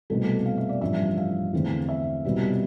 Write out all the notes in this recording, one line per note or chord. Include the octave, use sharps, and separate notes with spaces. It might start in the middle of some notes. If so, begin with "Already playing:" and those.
C2 B2 A3 C4 A4
F5
E5
D5
A1 G2 F3 E5
F5
E2 D3 A3 C4
E5
C2 B2 G3 C4